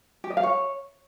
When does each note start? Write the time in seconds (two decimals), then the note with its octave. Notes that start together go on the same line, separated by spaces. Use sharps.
0.24 G4
0.30 D#5
0.37 F5
0.43 C#5